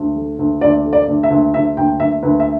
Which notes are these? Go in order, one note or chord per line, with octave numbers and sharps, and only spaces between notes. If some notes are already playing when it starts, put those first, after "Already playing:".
Already playing: D2
A3
D2
D2 D5
A3
D5
D2
E5
D2
D2 E5
D2 G5
D2 E5
D2 B4
E5